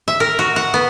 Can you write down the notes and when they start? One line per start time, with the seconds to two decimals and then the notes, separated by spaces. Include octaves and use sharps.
0.08 E5
0.20 A#4
0.39 F#4
0.56 F#5
0.74 B3